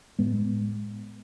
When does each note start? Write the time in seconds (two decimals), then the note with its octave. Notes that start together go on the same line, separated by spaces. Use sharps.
0.19 A2 G#3 B3